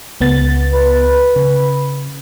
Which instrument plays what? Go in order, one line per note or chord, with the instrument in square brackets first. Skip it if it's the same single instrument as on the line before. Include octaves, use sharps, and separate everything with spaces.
[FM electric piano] C#2 B3 A6
[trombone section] B4
[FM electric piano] C#3